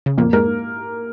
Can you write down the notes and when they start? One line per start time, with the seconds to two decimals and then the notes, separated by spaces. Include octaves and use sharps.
0.06 C#3
0.18 F2 A#2 A#3
0.33 G#2 A#4